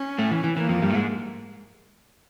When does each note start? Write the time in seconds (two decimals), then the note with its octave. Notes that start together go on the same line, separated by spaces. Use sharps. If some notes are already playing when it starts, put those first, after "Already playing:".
Already playing: C#4
0.18 A2 A3
0.31 E3
0.44 E3
0.56 E3 A#3
0.69 F2 F3
0.82 G2 G3
0.90 A3
0.95 G#2 G#3